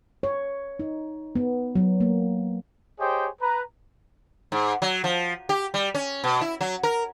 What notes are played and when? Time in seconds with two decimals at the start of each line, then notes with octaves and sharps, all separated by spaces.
0.23 C#5
0.79 D#4
1.35 B3
1.75 F#3
2.00 A#3
3.00 G4 G#4 C5 C#5 D#5 G5
3.41 B4 A#5
4.52 G#2
4.82 F#3
5.04 F3
5.49 G4
5.74 G3
5.95 C#4
6.24 B2
6.41 E4
6.61 F#3
6.83 A#4